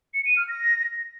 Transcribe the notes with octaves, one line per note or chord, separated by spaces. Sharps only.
C#7
D#7
F6
A#6